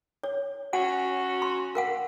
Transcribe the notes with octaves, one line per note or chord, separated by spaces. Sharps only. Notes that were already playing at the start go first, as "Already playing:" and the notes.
C#5
F#3 C#4 F#4 F#5
C6
A#4 F5 F#5